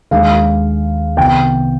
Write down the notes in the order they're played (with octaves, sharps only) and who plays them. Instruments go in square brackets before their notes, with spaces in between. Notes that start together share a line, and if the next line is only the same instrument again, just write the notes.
[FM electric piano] D#2 D#3 G#3 D4 G#4 [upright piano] F5
[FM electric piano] C2 C3 D#3 B3 [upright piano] G5